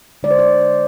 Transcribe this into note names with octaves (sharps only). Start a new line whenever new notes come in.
D3 G#3 D5
C5
D5